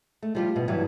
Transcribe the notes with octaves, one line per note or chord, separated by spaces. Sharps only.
A3
F3 G3 F4
B2
G2 E3 F#3 G3